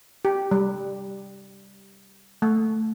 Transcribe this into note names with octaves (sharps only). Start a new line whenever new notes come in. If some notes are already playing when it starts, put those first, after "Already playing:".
G4
G3
A3